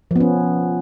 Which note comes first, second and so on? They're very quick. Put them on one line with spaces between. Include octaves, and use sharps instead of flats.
F3 B3 C#4